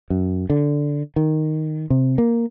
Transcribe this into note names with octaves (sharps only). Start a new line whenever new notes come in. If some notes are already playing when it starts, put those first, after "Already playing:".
F#2
D3
D#3
C3
A#3